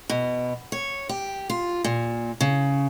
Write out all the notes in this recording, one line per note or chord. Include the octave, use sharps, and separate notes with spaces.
B2
C#5
G4
F4
A#2
C#3